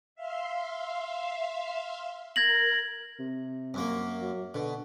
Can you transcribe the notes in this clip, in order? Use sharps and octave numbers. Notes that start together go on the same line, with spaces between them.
E5 F5 C6
A#4 G#6 A#6 F#7
C3
F#2 A#3
F#3
B2 D3